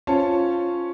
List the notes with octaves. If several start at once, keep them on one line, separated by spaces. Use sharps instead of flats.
C#4 F4 C5 C#5 A5